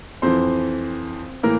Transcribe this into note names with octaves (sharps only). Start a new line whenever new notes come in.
F2 E3 C4 C5
A2 E3 A#3 A#4